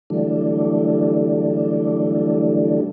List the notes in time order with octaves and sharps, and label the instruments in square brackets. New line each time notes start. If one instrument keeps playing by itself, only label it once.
[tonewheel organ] D3 E3 F#3 G3 A3 D4